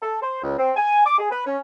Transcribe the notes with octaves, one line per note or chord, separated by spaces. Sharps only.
A4
C5
C#2
C4
G#5
D6
G#4
B4
C#4